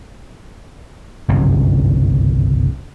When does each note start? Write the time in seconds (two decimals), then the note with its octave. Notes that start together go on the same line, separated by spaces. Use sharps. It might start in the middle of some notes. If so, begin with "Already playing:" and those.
1.28 G1 C2 F#2 C#3